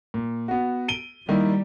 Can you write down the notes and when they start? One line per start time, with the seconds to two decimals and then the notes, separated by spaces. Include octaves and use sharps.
0.14 A#2
0.48 B3 F#4
0.88 D7 D#7 G7
1.29 D#3 G3 A#3 E4